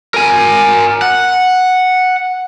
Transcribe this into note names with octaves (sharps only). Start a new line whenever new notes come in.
A#4 G#5
F#5